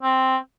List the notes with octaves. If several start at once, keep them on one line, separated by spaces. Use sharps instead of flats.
C4